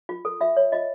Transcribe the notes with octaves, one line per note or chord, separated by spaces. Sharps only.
F4
A4
F4 E5
C#5
F4 D#5